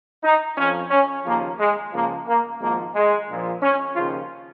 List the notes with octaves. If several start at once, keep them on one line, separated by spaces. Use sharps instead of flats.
D#4
F2 F3 C#4
C#4
D#2 C#3 F3 A#3
G#3
C#2 C#3 F3 A#3
A#3
G#1 G#2 F3 A#3
G#3
A#1 A#2 F3
C#4
D#2 C#3 F3 F4